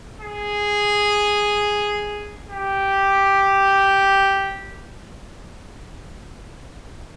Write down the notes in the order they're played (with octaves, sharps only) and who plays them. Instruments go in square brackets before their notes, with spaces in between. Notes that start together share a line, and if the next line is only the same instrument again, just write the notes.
[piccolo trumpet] G#4
G4